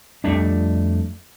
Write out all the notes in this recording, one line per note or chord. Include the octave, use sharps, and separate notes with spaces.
F2 G3 A3 D4